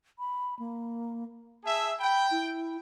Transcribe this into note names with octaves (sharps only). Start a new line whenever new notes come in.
B5
A#3
G#4 E5 A5
G5 B5
E4